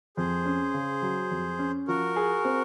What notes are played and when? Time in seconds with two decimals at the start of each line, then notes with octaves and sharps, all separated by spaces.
0.17 F2 G#4 C5
0.46 C#4
0.74 C#3
1.02 F#3
1.31 F2
1.59 C#4
1.88 F3 F#4 A#4
2.16 G#4
2.45 C4